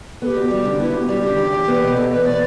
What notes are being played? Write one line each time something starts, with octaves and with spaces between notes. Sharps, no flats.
B3 A4
G4
D2
G3
D3
B3 E4
D2 G4
G3 G4
D3 G4
E2
E2
B3
B2
E2 A4
E2 B4
B3 D5